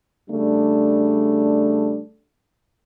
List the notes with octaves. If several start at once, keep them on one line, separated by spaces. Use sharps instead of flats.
C#3 G3 A3 D4